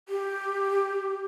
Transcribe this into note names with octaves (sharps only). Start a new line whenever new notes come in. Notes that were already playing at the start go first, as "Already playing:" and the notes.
G4